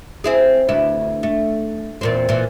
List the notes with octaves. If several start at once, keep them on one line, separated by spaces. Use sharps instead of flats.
C4 E4 G#4
D2 E4 B4
A3
E2 A#2 C4
A#2 E3